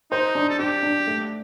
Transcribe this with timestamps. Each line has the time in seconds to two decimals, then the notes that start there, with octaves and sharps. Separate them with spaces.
0.11 D#4 C5
0.35 D4
0.50 A4
0.59 D4 G4
0.83 D4
1.07 A3